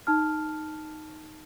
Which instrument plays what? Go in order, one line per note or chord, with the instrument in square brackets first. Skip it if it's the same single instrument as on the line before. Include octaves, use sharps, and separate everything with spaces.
[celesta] D#4 A5 F6